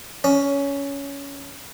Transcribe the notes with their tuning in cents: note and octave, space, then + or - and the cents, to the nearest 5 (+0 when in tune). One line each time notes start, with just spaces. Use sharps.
C#4 +15